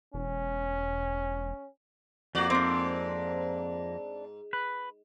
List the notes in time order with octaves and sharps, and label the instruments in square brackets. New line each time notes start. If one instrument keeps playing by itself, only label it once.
[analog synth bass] E1 [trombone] C#4
[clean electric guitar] F2 A#3 [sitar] F#4 D5
[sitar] G#2 [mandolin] C4 D4
[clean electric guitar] B4